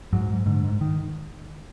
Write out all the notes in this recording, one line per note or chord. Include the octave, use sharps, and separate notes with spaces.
G#2 F#3
G#2
G#2 D3
G#2
D#3